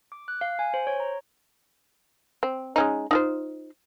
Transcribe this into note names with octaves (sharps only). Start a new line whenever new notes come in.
D6
F#6
F5
G#5
C5
C#5
A#5
C4
G#3 C#4 D#4
D#4 F4 C5